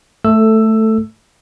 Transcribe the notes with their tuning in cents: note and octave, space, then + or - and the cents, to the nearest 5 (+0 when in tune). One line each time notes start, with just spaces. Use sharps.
A3 +0 A4 +10 E6 +10